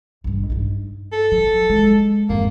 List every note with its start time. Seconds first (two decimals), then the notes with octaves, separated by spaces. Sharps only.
0.24 A#1 G2
0.50 G2 D#4
1.12 A4
1.32 F#3
1.70 G#3
2.29 F2 G#2 A#3